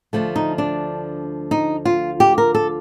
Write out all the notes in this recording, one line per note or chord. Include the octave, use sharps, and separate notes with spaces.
D2 D3 F3 A3
D#4
D4
D#4
F4
G4
A#4
A4